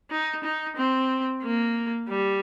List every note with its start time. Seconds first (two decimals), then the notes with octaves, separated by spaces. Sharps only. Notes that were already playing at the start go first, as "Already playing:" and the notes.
0.11 D#4
0.44 D#4
0.77 C4
1.43 A#3
2.09 G3